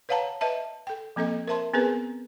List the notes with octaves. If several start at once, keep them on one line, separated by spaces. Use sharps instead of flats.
B4 C#5 F5 F#5 A5 A#5
B4 D#5 E5 A5
A4 G5
F3 A#3 C4 A4 D#5
A#4 C5 E5 A5 C6
B3 C4 G#4 A#4 B4